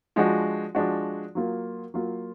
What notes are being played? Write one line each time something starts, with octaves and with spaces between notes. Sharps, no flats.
F3 G#3 D4 F#4
F3 G#3 D4 F#4
F#3 A#3 F4
F#3 A#3 F4